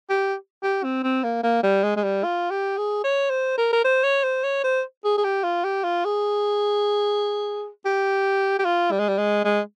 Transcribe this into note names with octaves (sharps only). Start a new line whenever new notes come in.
G4
G4
C4
C4
A#3
A#3
G3
G#3
G#3
G3
F4
G4
G#4
C#5
C5
A#4
A#4
C5
C#5
C5
C#5
C5
G#4
G#4
G4
F4
G4
F4
G#4
G4
G4
F4
G3
G#3
G3
G#3
G#3